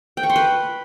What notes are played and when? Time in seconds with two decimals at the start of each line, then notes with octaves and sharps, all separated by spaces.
0.17 G5
0.23 C#6
0.30 C6
0.36 B4